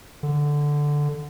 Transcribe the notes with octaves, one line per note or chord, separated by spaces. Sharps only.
D3